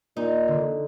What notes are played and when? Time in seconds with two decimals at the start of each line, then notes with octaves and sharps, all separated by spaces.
0.17 A#2 D#4
0.48 D3